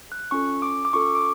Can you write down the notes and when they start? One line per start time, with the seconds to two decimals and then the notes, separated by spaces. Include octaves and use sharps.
0.12 F#6
0.31 C#4 F4 A4 C#6
0.62 D6
0.85 D6
0.93 C#4 F4 A4 C#6
1.15 D6